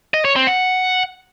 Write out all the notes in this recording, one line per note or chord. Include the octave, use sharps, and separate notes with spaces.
D#5
C#5
C4
F#5